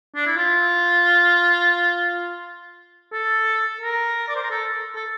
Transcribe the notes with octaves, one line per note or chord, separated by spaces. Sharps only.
D4
E4
F4
A4
A#4
D5
C5
A#4
A4
A4